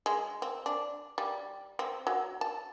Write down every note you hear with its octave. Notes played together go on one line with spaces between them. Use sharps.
G#3
C4
D4
G3
C4
F#3
A5